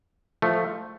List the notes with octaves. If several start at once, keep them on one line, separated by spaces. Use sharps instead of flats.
F3 A3